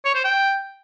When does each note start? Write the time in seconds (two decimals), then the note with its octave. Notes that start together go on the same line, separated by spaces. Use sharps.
0.05 C#5
0.15 C5
0.24 G5